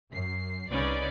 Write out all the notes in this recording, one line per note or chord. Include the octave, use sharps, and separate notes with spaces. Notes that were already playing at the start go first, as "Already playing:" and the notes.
F#2 C7
C2 C#3 C#4 D#4 B4 D5